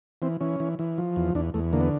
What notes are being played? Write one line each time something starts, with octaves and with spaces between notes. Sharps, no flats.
E3 C4
E3 C#4
E3
E3
F3
E2
E2 D4
E2 A3
D3 A#3
B3